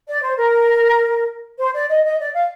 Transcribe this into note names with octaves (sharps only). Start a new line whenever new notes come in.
D5
C5
A#4
C5
D5
D#5
D#5
D5
F5